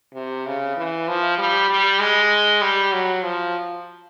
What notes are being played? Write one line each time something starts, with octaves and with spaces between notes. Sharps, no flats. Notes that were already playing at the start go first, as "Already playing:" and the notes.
C3
C#3
E3
F3
G3
G3
G#3
G3
F#3
F3